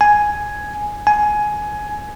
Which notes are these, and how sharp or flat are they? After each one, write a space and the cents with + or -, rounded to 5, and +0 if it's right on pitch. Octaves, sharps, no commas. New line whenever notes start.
G#5 +5
G#5 +15